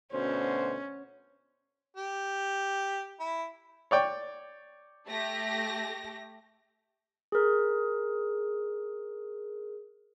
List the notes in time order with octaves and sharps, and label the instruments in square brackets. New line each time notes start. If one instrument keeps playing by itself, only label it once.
[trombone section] D2 B2 C5 [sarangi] C#4
[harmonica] G4
E4
[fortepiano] C#5 D5 G5
[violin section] A3 G4 A#6
[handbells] G#4 A#4